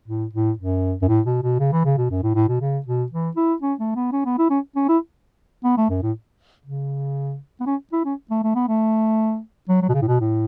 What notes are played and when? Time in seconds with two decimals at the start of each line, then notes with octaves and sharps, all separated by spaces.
0.08 A2
0.33 A2
0.59 F#2
1.02 F#2
1.08 A2
1.26 B2
1.43 B2
1.59 C#3
1.72 E3
1.85 C#3
1.98 B2
2.11 F#2
2.23 A2
2.35 A2
2.48 B2
2.61 C#3
2.86 B2
3.12 E3
3.36 E4
3.62 C#4
3.79 A3
3.95 B3
4.12 C#4
4.25 B3
4.38 E4
4.50 C#4
4.76 C#4
4.89 E4
5.64 B3
5.78 A3
5.90 F#2
6.03 A2
6.66 C#3
7.60 B3
7.66 C#4
7.92 E4
8.05 C#4
8.30 A3
8.43 A3
8.55 B3
8.68 A3
9.69 F#3
9.82 F#3
9.89 B2
9.94 C#3
10.02 A2
10.07 B2
10.21 A2